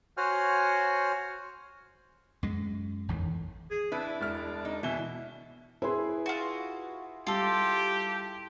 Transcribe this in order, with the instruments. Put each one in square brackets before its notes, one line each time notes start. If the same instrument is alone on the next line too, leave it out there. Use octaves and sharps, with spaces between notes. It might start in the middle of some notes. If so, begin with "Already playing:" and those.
[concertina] F#4 C5 C#5 F#5 G#5 F6
[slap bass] F#2 G#3
A1 E2 A2 D#3
[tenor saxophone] G#4
[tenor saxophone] D4 [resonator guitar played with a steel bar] E4 [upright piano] B4
[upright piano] E1 F6
[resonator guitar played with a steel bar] D#4
[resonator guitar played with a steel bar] B2 [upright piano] E3 G7 [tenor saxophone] E4
[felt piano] E4 G#4 C6 [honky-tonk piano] B4
[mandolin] F4 F#4
[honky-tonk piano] G3 [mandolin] F4 A4 [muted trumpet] G4